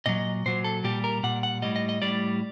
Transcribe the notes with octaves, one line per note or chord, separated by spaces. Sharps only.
A#2 F#3 D#5
A#2 F#3 C5
A4
A#2 G3 G4
A#4
A#2 G3 F#5
F#5
A2 G3 D#5
D#5
D#5
A2 G3 D5